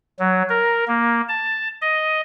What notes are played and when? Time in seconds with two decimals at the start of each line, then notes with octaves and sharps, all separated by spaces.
0.20 F#3
0.50 A#4
0.88 A#3
1.29 A5
1.82 D#5